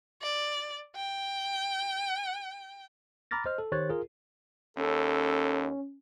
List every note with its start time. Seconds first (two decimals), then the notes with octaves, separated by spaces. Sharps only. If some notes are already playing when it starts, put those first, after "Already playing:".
0.22 D5
0.97 G5
3.31 A#5 B5 D6 F6 A6 A#6
3.46 C5 D#5 F6
3.58 A4
3.72 D#3 G4 C5 C#5 F#6 A6
3.89 F4 G#4 A#4
4.77 D#2 C#4 A4